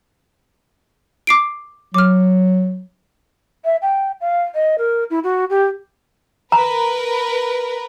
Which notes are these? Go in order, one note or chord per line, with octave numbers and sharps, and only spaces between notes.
D6 C7 D7
F#3 D6 F6
E5
G5
F5
D#5
A#4
E4
F#4
G4
A#4 B4 A#5